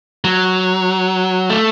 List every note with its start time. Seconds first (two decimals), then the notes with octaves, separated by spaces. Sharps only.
0.24 F#3
1.50 A3